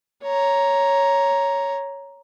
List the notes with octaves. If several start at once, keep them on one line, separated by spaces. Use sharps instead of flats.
C#5 A#5